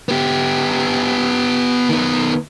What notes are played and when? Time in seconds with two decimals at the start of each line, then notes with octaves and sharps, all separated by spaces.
0.09 B3 G4
1.89 D#3 B3